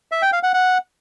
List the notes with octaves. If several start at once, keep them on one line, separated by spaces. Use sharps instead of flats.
E5
G5
F5
F#5
F#5